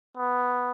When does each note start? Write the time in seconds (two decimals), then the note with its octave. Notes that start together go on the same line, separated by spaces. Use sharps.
0.17 B3